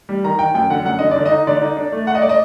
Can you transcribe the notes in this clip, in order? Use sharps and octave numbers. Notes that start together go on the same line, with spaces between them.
G3
D#3 A#5
D#3 G5
F#2 G5
D3 F#5
F#2 F#5
D3 D#5
D5
D3
D#5
D#4
D3 D5
D#4
D4
A3
A3 F#5
D#5
A3 D5
D#5